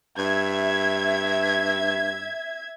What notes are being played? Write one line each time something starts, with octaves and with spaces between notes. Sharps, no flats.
G2 E5 G#6